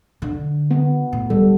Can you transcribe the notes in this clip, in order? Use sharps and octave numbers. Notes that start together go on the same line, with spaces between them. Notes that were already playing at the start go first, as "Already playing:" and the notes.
D3
B3
A2
D1 G3 A4